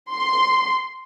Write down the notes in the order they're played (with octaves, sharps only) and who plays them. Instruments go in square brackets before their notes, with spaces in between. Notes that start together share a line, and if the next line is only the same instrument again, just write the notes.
[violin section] C6